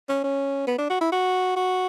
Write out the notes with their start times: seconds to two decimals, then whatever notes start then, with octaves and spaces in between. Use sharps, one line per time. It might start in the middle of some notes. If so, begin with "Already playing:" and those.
0.09 C#4
0.24 C#4
0.67 B3
0.78 D4
0.90 F#4
1.01 E4
1.12 F#4
1.56 F#4